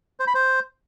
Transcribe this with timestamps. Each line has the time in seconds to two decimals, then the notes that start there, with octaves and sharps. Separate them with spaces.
0.20 C5
0.27 B5
0.35 C5